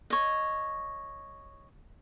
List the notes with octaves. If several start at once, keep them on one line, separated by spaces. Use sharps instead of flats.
C#5 D#5